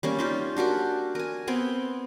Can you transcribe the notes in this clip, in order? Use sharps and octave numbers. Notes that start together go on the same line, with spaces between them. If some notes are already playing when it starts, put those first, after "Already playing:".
G3 A#3 C#4
D#4 F4 G4
D4 F#4 G4 A#4
A#4 G#5
B3 C4 G5